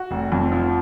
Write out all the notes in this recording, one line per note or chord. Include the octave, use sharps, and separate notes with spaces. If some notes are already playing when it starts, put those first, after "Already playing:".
Already playing: F#4
F1
F2
F3